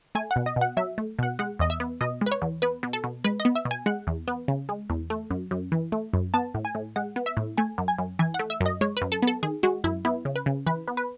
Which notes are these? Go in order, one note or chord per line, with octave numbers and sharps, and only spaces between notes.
A3 G#5
F#5
B2
D#5
B2
F#5
F#3 E5
A3
B2 F#5
G#3 F#5
E2 D#5
E5
B3
B2 D#5
G#3
B4
C#5
E2
B3 B4
B2
A4
B2
G#3 B4
D#5
B3
E5
B2
G#5
G#3 F#5
E2
B3
C#3
G#3
E2
A3
F#2
F#2
E3
A3
F#2
B3 A5
A2
G#5
A2
G#3 F#5
B3
E5
A2
A3 G#5
F#2
G#5
F#2
E3 G#5
F#5
A3
E5
F#2
D#5
G#3 C#5
B4
F#2
A4
B3
A4
D#3 G#4
G#3 F#4
F#2 E4
B3 E4
C#3
B4
C#3
E3 B4
B3
B4